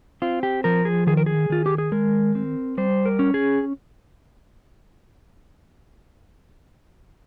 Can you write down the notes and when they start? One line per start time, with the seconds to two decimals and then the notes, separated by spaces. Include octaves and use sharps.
0.22 C4 F4
0.43 G4
0.64 F3 A#4
0.85 G#4
1.07 D#3 G#4
1.17 A#4
1.26 G#4
1.50 D#3 F4
1.66 G4
1.78 G#4
1.92 G#3 A#4
2.35 C4
2.78 G3 C5
3.05 A#4
3.19 C#4
3.34 G#4